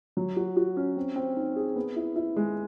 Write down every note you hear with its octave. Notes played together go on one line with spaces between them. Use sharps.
F#3
F#4
F#4
C#4
C4
C4
D#4
G#4
B3
E4
E4
G#3